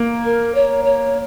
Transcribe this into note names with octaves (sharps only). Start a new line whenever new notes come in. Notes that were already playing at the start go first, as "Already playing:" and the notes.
Already playing: A#3
A#4
C#5
C#5